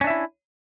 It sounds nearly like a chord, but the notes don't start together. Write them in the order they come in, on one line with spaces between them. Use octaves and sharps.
C#4 D4 E5 E4